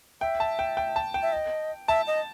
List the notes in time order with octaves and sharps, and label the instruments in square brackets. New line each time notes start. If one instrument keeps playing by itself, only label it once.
[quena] E5 [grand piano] G5
[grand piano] A5
G5
G5
A5
G5
[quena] E5
D#5
[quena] E5 [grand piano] A5
[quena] D#5